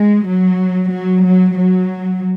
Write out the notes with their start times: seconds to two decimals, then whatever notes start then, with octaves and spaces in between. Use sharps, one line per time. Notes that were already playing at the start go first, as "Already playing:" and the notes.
Already playing: G#3
0.26 F#3
0.90 F#3
1.23 F#3
1.55 F#3